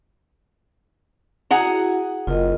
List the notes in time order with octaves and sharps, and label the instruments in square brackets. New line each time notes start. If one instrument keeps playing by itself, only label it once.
[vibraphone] E4 F#4 [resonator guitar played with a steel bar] G#4 F#5 A#5
[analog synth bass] F#1 [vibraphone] F4 A#4 D#5